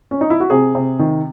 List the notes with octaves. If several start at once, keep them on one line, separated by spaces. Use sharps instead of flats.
C#4
D#4
E4
F#4
C3 G#4
C3
D#3